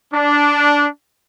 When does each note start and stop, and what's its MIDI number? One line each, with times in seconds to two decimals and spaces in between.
0.12 0.86 62